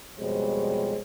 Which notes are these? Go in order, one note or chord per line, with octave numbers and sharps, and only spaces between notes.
F2 B2 G3 G#3 C5 C#5